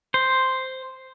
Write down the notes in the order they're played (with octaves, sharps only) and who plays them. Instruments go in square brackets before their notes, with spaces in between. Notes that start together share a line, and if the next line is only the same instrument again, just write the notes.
[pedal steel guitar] C5